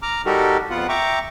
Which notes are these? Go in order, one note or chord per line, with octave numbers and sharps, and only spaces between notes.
A#5 D6 F6
G3 D#4 F#4 G4 A4 A#4
F2 B3 F4 F#5
E5 G5 A#5 C#6 D6